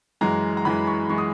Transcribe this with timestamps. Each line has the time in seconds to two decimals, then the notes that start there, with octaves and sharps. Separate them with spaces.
0.21 F#2 E3 G#3 A#5
0.57 A#5
0.65 F#2 E3 G#3 B5
0.87 C#6
1.09 E3 G#3 C#6
1.18 D#6